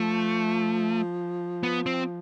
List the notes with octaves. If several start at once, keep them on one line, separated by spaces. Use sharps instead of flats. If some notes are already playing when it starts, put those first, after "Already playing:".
Already playing: F3 A3
B3
C4